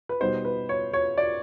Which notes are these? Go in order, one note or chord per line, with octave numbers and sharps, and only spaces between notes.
B4
B2 G3 B3 D#4 C5
B4
C#5
C#5
D5